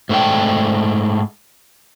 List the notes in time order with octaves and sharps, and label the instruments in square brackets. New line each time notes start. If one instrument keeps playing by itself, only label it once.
[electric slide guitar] G#2 A3 D4 G5